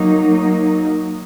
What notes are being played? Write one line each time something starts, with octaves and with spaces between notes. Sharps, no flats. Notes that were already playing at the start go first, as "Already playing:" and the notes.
Already playing: F#3 A#3 D#4